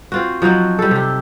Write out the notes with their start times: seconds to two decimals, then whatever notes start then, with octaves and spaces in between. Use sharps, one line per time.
0.12 C4 F4 F#4
0.42 F3 F#3 D#4 F#4
0.79 G3 A4
0.91 C3 G4